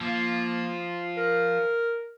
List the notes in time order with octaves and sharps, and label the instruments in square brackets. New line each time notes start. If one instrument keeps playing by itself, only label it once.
[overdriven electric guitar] F3 [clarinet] A#3
[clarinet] A#4